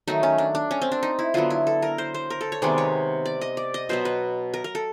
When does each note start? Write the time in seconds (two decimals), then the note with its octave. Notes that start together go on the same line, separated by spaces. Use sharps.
0.08 D#3 F#3 A3 D#4
0.23 C#4
0.38 D4
0.55 D4
0.71 C#4
0.82 C4
0.92 D4
1.03 D#4
1.19 E4
1.34 D3 F#3 B3 F4
1.50 E4
1.67 A4
1.82 A#4
1.98 C5
2.14 C5
2.30 A#4
2.41 A4
2.52 C#5
2.62 C3 D#3 G#3 B3 D5
2.78 C#5
3.26 D5
3.41 D#5
3.57 D5
3.74 D#5
3.89 B2 F#3 B3 C5
4.05 B4
4.54 A#4
4.64 A#4
4.75 A4